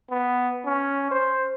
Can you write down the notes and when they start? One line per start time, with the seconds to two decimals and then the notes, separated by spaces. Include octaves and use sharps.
0.10 B3
0.66 C#4
1.11 C5